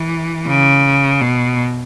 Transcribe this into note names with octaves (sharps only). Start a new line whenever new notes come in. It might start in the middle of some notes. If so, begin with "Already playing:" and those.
Already playing: E3
C#3
B2